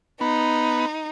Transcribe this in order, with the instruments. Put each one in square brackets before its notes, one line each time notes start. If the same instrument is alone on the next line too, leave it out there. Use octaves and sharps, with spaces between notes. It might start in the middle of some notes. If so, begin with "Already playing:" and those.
[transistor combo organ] B3 [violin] D#4